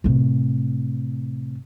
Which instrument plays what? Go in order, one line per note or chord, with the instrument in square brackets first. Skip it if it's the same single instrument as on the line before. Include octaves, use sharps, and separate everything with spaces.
[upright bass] A2 C3